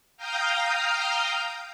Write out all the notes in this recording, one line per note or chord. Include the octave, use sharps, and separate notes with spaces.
F5 G5 A#5 D#6 F6 G6